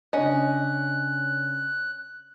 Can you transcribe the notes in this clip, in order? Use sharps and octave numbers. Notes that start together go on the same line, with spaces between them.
C#3 C#4 D4 D#5 F#6